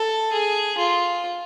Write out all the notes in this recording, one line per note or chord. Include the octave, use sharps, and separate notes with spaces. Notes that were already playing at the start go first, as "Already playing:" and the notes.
Already playing: A4
G#4
F4